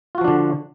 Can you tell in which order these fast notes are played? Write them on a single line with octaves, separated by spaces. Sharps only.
F4 F#4 F3 D4 D3